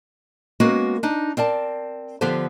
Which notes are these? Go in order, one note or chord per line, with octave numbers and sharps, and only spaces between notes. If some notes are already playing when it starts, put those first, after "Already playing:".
G#3 A#3 B3 C#4 F#4 A#4
D4 D#4
C4 A#4 D5 A5
D3 F3 B3 G4 A4 C5